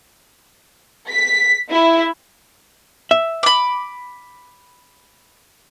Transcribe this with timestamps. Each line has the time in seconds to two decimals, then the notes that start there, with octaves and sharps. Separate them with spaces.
1.12 B6
1.72 E4
3.11 E5
3.43 B5 D6